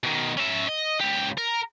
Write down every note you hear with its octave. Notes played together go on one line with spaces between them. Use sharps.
B2 D#3
C#4 E5
D#5
C#2 G4
A#4